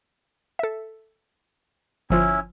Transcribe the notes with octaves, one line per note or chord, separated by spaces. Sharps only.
A4 E5
G1 F3 C#4 E4 F4